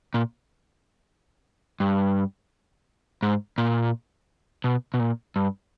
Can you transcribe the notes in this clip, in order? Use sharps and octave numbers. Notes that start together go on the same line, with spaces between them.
A#2
G2
G#2
A#2
B2
B2
A#2
G2